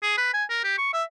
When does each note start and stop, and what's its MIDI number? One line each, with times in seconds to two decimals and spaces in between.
0.03 0.16 68
0.18 0.32 71
0.34 0.44 80
0.50 0.63 70
0.64 0.77 67
0.78 0.91 85
0.93 1.03 76